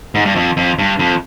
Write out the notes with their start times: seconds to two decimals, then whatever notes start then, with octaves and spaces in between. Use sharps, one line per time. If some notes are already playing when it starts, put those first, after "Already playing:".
0.15 G#2
0.25 G2
0.36 F2
0.57 F2
0.79 G2
0.99 F2